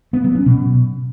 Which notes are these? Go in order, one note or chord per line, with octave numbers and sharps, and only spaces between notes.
B3
F#3
C#4
B2